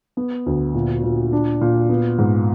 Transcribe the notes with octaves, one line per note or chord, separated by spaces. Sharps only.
B3
D2
A#2
A#2
D4
A#2
B3
G#2